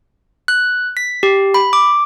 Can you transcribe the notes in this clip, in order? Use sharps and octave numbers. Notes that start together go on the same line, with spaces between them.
F#6
B6
G4
B5
D6